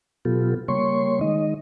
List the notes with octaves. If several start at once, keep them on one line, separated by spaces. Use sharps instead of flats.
B2 F#3 B3 F4 G4 A4
C#3 G3 A#3 C#5 C6 C#6
D#3 G#3 D#4 D#5